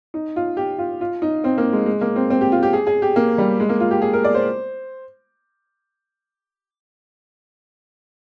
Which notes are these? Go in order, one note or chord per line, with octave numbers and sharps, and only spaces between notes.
D#4
F4
G4
F4
F4
D#4
C4
A#3
G#3
G#3
A#3
C4
C4
G4
F4
G4
G#4
G#4
G4
A#3
G3
G#3
A#3
F4
G4
G#4
A#4
D5
C5